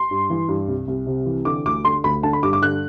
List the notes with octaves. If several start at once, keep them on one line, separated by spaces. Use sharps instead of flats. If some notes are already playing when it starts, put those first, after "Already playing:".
Already playing: C6
G2
E3
G2
C2
C2
C3
E3
D3 D6
D2 D6
D3 C6
D2 B5
D3 A5
B5
G2 D6
D6
D3 F#6